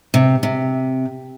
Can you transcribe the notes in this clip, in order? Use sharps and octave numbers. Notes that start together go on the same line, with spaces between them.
C3
C3